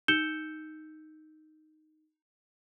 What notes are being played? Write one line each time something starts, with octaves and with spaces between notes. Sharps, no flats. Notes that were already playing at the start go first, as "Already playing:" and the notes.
D#4 E6 G6 C#7 E7 G7